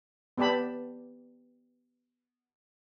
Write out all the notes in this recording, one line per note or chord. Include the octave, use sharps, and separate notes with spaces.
B3 G4 D5 A5 B5